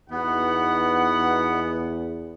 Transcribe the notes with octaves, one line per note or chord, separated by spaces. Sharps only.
E2 B3 D#4 F#4 F#5